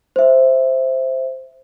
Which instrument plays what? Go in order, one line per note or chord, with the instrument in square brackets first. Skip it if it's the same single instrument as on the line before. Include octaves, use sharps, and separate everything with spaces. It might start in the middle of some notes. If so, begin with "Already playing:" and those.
[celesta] C5 E5